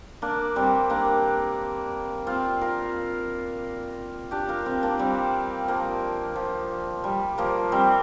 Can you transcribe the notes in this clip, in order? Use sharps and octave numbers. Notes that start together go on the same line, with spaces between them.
A#3 D4
G3 C4
A#3 D4
C4 F4
F4 A#4
D4 G4
F4 A#4
C4 F4
A#3 D4
G3 C4
F3 A#3
F3
G3
F3 A#3
G3 C4